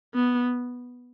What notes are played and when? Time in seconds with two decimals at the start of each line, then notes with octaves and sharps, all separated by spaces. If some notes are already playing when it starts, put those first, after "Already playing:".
0.15 B3